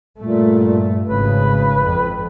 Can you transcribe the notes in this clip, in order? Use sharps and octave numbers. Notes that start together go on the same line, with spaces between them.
G2 A#2 A3
G#1 C#3 B4
F2